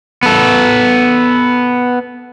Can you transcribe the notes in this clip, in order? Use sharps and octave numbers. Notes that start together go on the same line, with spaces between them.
B3 A4